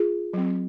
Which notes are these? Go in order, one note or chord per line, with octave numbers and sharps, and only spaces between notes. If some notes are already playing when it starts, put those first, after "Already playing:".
Already playing: F4 G#4
F#3 C4